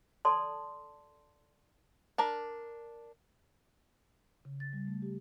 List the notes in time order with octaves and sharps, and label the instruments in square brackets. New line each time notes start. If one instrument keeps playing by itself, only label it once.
[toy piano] A4 D5 A5 C6
[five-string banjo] D4 A#4 A5
[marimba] C#3
A6
G3
A3
G4